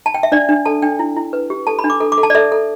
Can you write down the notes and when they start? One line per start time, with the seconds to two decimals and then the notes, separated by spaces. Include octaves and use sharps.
0.06 A5
0.14 G5
0.23 E5
0.32 D4 D5
0.49 D4
0.65 A4 A5
0.82 D4 G5
0.99 E4
1.17 E4
1.33 B4
1.50 G4
1.67 A4 A5
1.79 B5
1.84 D4
1.90 D6
2.00 A4
2.12 D6
2.18 A4
2.23 A5
2.30 D5
2.35 A4 E5
2.52 A4